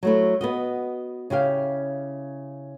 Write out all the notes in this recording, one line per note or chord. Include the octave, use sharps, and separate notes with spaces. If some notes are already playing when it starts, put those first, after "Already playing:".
F#3 A3 E4
B3 F#4 D#5
C#3 E4 G4 F5